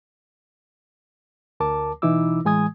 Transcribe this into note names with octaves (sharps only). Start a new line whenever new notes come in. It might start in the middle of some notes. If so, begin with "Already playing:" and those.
D2 A#4 A5 D6
B2 E3 D#4 E4 D6 E6
A2 E3 G#3 G#5 D#6 G#6